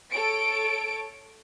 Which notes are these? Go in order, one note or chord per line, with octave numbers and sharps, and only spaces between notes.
A4 C#5 D7